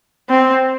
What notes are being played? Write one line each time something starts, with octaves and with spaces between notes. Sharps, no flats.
C4